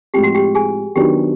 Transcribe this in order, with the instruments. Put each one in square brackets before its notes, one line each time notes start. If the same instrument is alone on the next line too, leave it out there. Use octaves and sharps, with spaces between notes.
[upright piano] A2 F3 G#3 C4 [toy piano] G4 G5
[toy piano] F#4 F#5
G4 G5
G#4 G#5
[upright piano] D#3 F#3 B3 D4 [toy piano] G4 G5